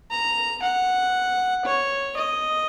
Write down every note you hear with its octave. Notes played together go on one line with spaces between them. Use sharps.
A#5
F#5
C#5
D#5